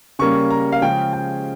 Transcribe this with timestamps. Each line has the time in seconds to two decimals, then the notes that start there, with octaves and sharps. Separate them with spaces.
0.19 C#3 G3 A#3 C#4 C#6
0.51 A#5
0.72 F5
0.82 C#3 F3 G#3 C#4 G5
1.13 G5